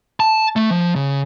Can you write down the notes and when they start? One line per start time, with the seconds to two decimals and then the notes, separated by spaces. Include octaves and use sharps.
0.20 A5
0.56 A3
0.71 F3
0.96 C#3